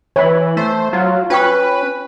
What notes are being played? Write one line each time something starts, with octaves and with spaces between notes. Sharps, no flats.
E3 C#5 B5
A3 C5
F#3 F4
C#4 F4 B4 G5 C#6